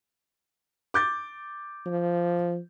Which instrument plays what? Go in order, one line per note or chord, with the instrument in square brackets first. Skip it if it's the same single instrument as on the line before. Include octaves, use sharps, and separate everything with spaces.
[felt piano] D6 G6 A6
[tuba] F3